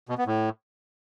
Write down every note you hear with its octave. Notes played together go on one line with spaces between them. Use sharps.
B2
B3
A2